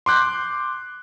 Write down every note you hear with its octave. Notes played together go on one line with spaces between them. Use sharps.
C6 D6 F#6 G6